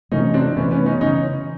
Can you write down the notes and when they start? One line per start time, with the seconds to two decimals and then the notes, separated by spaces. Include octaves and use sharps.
0.11 C3 E3 A3 C#4 D#4
0.29 D#4
0.34 C4 D4
0.56 C3 E3 A3 B3 C#4
0.71 B3 C#4
0.86 C#4 D#4
1.01 C#3 E3 C#4 D#4